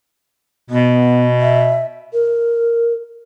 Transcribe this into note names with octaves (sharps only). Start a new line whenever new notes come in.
B2 B3
E5
A#4